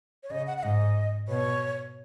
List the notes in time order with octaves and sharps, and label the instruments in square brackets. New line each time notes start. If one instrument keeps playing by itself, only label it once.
[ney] C#5
[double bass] C#3 [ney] D#5
[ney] F#5
F#5
[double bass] G#2 [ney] D#5
[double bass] B2 [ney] C#5